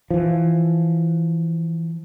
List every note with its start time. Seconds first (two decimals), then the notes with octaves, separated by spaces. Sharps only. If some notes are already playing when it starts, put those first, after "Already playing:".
0.11 E3 F3